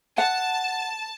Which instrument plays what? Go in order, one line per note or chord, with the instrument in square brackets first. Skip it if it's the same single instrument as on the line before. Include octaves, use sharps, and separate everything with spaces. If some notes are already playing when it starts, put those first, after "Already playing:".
[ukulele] F#5 [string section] A5